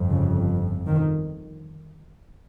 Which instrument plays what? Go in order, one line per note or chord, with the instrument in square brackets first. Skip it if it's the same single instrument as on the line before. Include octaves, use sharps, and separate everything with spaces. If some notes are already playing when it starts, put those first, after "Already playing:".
Already playing: [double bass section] G1 F2
C#3
D#3